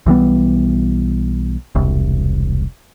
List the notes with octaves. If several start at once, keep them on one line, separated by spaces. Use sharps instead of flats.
B1 E3 G3 B3
E1 C2